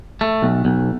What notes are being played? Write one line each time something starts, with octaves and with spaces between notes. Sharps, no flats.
A3
B1
B1